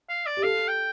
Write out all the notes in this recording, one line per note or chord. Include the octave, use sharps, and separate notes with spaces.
F5
D5
G4
A4 F5
G5